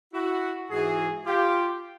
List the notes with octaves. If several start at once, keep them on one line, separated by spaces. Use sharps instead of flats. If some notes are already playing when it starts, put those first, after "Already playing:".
E4 F#4
G#2 E3 F#4 G#4
F4 G4